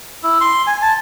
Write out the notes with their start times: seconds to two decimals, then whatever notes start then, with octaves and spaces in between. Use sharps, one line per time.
0.24 E4
0.41 C6
0.67 G#5
0.82 A5